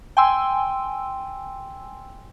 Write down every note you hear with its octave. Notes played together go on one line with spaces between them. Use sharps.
G5 G#5 C6 E6